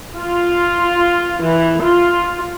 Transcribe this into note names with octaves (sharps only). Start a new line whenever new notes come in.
F4
E3
F4